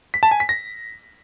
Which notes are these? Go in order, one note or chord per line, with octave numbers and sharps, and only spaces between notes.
B6
A5
G#5
B6
A#6